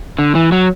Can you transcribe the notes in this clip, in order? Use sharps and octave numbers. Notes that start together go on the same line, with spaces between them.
D3
E3
F#3